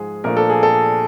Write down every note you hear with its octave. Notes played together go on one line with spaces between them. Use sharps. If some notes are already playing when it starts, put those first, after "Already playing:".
Already playing: G#2 F3 G#3 G#4
A#2 F3 A3 D4 A#4
A4
G#4
A4